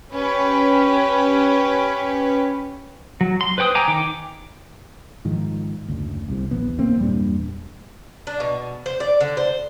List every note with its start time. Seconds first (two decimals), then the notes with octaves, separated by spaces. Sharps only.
0.13 C#4 G4 B4
3.21 F#3
3.41 C6
3.58 B4 C5 G5 D6 D#6
3.75 G5 G#5 A#5 D6
3.88 D#3 G5 D6
5.25 G#2 D#3 F3
5.88 F#1 D2
6.28 C2 C3
6.51 D#1 A#1 E2 B3
6.78 F#1 E2 A#3 C4
7.00 E2 G2 A#2 G3
8.27 D4
8.40 B2
8.86 C5
9.00 D5
9.21 D3
9.37 C5